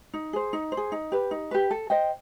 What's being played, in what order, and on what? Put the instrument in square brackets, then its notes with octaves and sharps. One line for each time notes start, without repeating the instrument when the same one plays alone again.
[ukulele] D#4
G#4 C5
D#4
C5
G#4
D#4
G4 B4
D#4
G4 B4
A4
C5 D#5 G5